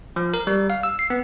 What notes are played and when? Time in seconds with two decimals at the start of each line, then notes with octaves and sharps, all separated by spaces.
0.16 F3
0.34 A#4
0.47 G3
0.70 F5
0.83 E6
0.99 C7
1.10 B3